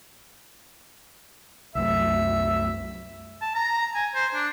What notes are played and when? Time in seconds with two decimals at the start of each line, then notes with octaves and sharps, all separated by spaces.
1.75 C2 F#2 A3 E5
3.41 A5
3.55 A#5
3.95 G#5
4.15 C5
4.35 D4